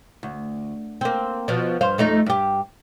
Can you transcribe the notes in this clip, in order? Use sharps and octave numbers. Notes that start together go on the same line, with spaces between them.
D2
A#3 C4
B2 F3
G2 C5 F5
F2 A3 D#4
G2 G4